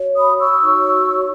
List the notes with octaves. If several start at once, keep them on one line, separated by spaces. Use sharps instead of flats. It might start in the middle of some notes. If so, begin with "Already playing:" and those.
Already playing: F#4 C#5
B5 D#6
C#6 E6
D#4 F#4 C#5